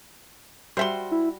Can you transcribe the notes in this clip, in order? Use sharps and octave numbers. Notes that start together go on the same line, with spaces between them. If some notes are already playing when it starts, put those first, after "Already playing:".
G3 F#4 C5 E5 C6
E4